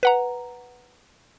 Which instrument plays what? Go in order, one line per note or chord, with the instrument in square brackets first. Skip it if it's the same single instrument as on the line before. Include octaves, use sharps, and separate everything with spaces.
[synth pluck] B4 F#5 A#5